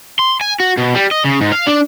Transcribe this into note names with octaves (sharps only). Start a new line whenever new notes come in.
C6
G#5
F#4
B2
G3
D#5
C#3
G#2
F5
D4